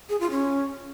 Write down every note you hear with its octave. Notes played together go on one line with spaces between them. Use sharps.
G#4
F4
C#4